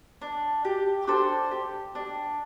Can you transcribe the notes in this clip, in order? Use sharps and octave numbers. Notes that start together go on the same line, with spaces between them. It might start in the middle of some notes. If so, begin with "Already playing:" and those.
D4
G4
D4 A4 C5
G4
D4